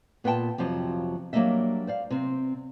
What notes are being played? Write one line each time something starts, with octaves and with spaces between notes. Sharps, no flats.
A#2 B3 F4 C#5 G5 A5
F2 C3 F3 F#3
F#3 G3 A#3 D4 D#5 E5
C5 D5 F5
C3 C4